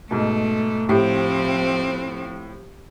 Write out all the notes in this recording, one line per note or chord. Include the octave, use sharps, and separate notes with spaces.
G#2 B2 A3
A2 F3 C4 G4